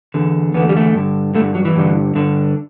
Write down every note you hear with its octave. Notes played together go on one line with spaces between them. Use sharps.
E2 D3
E2 D3 B3
A3
G3
A3
G2 D3
G2 D3 A3
F#3
E3
G2 D3
G2 D3